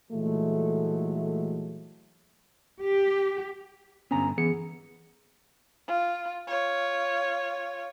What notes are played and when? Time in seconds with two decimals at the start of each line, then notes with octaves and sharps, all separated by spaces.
0.11 A#2 E3 F#3 G#3 A3
2.83 G4
4.11 G2 D3 B3 C#4 G#5 A#5
4.38 E3 B3 G#4 C#7
5.88 F4
6.47 F4 C#5